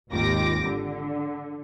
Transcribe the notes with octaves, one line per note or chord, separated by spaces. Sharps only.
G#1 D#2 F4 G4 D6 A#6
D3